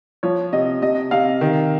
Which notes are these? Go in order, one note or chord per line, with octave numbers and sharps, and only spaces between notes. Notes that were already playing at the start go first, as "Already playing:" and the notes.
F3 C#5
C3 D#5
C3 D#5
C3 F5
D#3